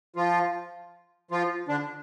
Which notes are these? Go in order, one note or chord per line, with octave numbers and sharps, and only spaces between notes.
F3 F4
F3 F4
D3 D4